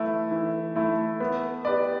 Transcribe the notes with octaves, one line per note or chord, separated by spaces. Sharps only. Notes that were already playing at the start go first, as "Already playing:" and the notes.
Already playing: E3 A3 E4
E3
A3 E4
B3
G4 B4 D5